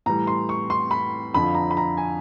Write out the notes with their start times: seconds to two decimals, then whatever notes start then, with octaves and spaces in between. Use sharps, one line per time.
0.06 A2 E3 G3 A#5
0.27 C6
0.49 C#6
0.70 C6
0.91 B5
1.34 F2 D3 F3 B5
1.55 A#5
1.71 B5
1.77 A#5
1.97 G#5